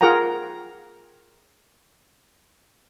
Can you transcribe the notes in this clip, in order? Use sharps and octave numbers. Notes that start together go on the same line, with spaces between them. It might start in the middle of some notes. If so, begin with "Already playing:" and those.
F4 G#4 A#4 F#5 G5 A#5